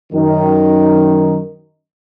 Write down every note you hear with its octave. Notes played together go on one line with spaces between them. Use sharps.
F#2 D#3